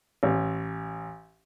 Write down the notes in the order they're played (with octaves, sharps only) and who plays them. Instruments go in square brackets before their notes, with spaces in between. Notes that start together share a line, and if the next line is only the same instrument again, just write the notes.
[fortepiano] A1